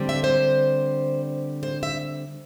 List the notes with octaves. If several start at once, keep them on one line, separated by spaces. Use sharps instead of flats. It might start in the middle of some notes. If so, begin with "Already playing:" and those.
Already playing: D3 G3 C4
E5
C5
C5
E5